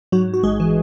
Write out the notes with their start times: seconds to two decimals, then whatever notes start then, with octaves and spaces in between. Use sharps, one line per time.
0.12 G#2 F#3 F#4
0.28 G#2
0.34 F#4
0.43 A1 G#3 G#4
0.60 E3